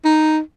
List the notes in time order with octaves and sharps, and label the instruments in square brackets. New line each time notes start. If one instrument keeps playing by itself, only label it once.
[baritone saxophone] D#4